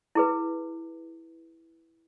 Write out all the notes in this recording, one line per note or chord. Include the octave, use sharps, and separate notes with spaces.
E4 G#4 B4